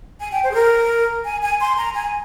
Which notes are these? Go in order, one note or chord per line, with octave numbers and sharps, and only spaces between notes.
G#5
G5
C5
G#4
A#4
G#5
G#5
C6
A#5
G#5